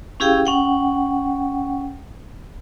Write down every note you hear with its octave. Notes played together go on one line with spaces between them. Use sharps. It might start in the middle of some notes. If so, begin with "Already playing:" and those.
C#4 E4 G4 G#4 F5 G5
C#4 F#5 G5